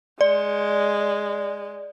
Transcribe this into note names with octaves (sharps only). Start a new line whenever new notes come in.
G#3 D5